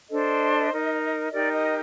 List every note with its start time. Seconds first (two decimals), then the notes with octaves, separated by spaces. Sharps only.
0.10 D4 A4 C5 D#5
0.71 D#4 A#4
1.32 D#4 G4 A#4 D5
1.52 D#5